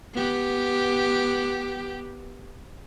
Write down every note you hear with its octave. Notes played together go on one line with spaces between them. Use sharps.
B3 G4